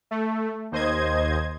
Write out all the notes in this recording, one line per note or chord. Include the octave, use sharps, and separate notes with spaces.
A3
D#2 C5 D#5 G#6